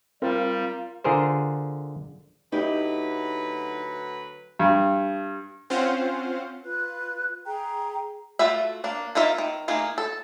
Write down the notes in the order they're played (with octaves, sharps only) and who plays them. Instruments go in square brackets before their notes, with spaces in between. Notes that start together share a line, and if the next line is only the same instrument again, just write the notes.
[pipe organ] G3 [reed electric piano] C4 [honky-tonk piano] F4 [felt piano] A#4
[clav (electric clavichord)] D3 F4 G#4 A#4 C5
[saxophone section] D2 F#3 B4 [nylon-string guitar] D#4 E4 G4
[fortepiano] G2
[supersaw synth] C4 C#4 F4 C5 F5 F#5
[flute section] F4 B4 F#6
G#4 G5 A#5
[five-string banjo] A3 F4 F#4 E5
A#3 D4
A#3 D#4 F4 E5
D#3
A3 A#3 D#4 G#4
A4